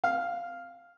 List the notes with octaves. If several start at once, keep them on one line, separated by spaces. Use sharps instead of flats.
F5